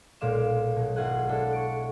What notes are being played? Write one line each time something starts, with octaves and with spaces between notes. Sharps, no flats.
B1 A#2 G#3 F5 D6 E7
B2 F#3
G#1 E4 F4 G#4 F#5
G#3 D4 E4 A4
C#6 C#7 D7